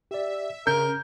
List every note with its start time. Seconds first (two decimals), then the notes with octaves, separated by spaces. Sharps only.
0.11 G4 D5 E5
0.67 C#3 C#4 A#4 G6